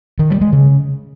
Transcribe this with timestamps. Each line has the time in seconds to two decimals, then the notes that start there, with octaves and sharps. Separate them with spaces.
0.19 D#3
0.30 G3
0.41 G#3
0.52 C#3